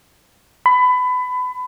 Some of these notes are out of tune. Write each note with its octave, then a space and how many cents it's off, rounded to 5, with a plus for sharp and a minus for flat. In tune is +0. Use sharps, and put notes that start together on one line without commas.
B5 +25